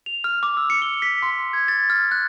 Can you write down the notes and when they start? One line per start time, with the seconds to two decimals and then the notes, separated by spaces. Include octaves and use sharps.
0.06 F7
0.24 F6
0.43 D6
0.57 E6
0.70 C#7
0.82 G7
1.02 B6
1.22 C6
1.53 G#6
1.68 A6
1.90 F6
2.11 F#6